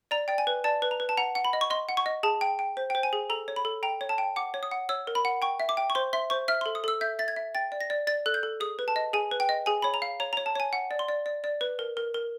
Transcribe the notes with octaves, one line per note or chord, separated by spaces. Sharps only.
D5 A#5
D5 G5
G#5
B4
D5 A5
B4
A#5
B4
A5
F#5 A#5
F#5
B5
D#5
C#6
D#5 C6
F#5
C#6
D#5
G#4 A5
G5
G5
C5
G5
C5
G#5
G#4
A4 A#5
C#5
B5
A4
G5 A#5
C#5
A5
G5
F#5 D6
C#5
D#6
F#5
C#5 E6
A#4
B5
F#5
G5 C#6
E5
D6
G5
C#6
C5 C6
E5 C6
C5 C#6
E5 F6
C6
A4
D#6
A4 E6
E5 G6
E5 A6
G#6
E5
G5 A6
D5
A#6
D5
D5 A6
A4 F#6
G6
A4
G#4 D#6
B4
A5
D#5
G#4 G#5
B4
G5
D#5
G#4 G#5
C#5 B5
A#5
F5
C#5 A#5
A#5
C#5
A5
C#5 G#5
F#5
D5
C6
D5
D5
D5
B4
A#4
A#4
A#4